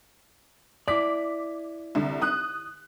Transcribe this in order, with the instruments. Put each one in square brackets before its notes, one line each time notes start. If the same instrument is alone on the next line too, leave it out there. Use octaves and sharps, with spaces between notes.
[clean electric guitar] E4 D5 [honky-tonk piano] D6 B6
[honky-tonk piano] C2 D3
D#6 F#6